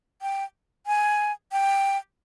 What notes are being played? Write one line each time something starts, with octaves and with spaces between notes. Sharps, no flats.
G5
G#5
G5